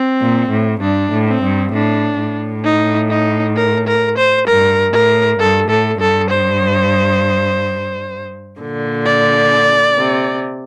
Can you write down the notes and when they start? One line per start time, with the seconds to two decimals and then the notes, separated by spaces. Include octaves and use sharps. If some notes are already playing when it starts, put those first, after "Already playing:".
Already playing: C4
0.21 A#2
0.51 A2
0.82 G2 D4
1.12 A2
1.28 C4
1.43 G2
1.73 A2 D4
2.19 A2
2.65 D#4
3.10 D#4
3.56 A#4
3.87 A#4
4.18 C5
4.47 G2 A#4
4.93 A2 A#4
5.39 G2 A4
5.69 A2 A4
6.00 G2 A4
6.30 C5
8.59 A#2 D3
9.06 D5
9.97 C3